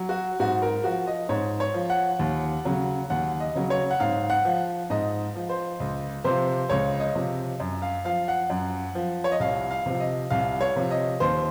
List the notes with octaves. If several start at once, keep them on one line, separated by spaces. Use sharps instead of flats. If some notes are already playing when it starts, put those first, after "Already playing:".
Already playing: F#3
F#4
G#2 F#4
A#4
F3 F#4
D#5
G#2 C#5
C#5
F3
F#5
D#2
C#3 F#3
D#2 F#5
D#5
C#3 F#3
C#5
F#5
G#2 F5
F#5
F3
G#2 D#5
F3
C5
C#2
C3 F3 C5
C#2 C#5
D#5
C3 F3
F#2
F5
F3 F5
F#5
F#2
F3
C#5
D#5
C2 F5
F5
C3 F3
D#5
C2 F5
C#5
C3 F3
D#5
D#2 C5